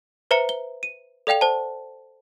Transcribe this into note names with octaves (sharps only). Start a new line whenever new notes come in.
B4 C5 E5 A#5 C#7 G7
G7
D#7
A4 D5 F5 G5 F7
C5 A5